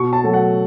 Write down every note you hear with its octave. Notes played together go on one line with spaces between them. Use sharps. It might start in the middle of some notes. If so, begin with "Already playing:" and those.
Already playing: B2 C#6
A5
F#3 A3
F#5